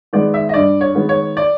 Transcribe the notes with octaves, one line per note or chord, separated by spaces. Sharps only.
D#3 G#3 B3 D5
E5
D#5
G2 D5
C#5
D#3 G#3 B3
C#5
D5